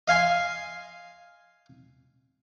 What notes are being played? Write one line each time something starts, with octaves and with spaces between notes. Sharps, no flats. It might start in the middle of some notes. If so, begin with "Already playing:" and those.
D#5 F5 G#5 C6